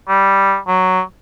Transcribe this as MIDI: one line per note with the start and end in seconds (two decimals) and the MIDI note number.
0.09 0.57 55
0.67 1.01 54